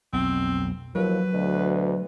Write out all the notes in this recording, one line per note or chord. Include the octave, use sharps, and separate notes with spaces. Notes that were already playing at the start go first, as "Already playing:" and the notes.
B1 F2 C4
D#2 F3 F#3 B4
D2 B2